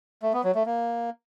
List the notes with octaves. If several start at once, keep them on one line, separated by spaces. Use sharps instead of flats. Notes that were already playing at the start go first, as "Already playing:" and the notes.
A3
B3
F#3
A3
A#3